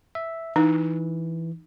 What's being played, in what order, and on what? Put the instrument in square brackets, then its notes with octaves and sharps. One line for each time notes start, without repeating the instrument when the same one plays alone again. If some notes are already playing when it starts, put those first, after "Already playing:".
[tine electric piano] E5
[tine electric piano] E3 [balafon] D#4